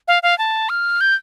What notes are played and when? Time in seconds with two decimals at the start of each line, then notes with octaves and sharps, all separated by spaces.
0.08 F5
0.23 F5
0.38 A5
0.69 F6
1.01 G6